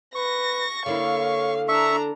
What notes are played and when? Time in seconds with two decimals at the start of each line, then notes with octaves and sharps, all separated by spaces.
0.15 B4 C#6 A#6
0.86 D3 A#3 E4 C#5 F5
1.68 D4 E5 A#5 C#6